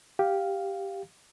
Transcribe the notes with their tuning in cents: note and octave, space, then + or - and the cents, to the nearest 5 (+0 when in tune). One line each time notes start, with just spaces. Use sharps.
G4 +0 F5 +0